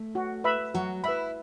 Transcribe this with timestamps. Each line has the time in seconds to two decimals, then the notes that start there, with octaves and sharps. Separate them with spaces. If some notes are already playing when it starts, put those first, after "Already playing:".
Already playing: A3
0.15 F#4
0.44 B4 E5 B5
0.74 F#3 F#4
1.04 E4 B4 E5 B5